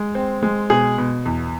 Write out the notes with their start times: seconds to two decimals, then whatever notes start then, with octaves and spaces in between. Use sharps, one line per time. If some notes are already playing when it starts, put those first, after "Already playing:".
Already playing: G#3
0.15 C4
0.43 G#3
0.70 B2 G#4
0.98 B2
1.25 E2